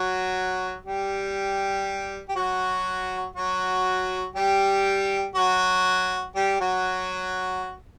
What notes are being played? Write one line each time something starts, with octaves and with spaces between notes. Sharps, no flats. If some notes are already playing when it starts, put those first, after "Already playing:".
Already playing: F#3 F#4
G3 G4
G4
F#3 F#4
F#3 F#4
G3 G4
F#3 F#4
G3 G4
F#3 F#4